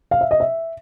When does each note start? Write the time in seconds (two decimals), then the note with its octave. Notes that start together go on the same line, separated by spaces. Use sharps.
0.11 F5
0.21 E5
0.31 D#5
0.40 E5